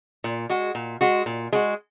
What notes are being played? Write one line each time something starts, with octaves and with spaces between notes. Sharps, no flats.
A#2
G#3 F#4
A#2
G#3 F#4
A#2
G#3 F#4